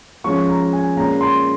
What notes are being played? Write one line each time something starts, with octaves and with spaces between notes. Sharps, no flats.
F3 G#3 C#4 C#6
A#5
G#5
A#2 G#3 C#4 A#5
C6